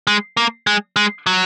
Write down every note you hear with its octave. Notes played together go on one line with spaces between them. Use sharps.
G#3
A#3
G#3
G#3
F#3